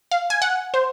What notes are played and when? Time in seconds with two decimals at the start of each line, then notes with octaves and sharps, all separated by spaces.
0.11 F5
0.30 G#5
0.42 F#5
0.74 C5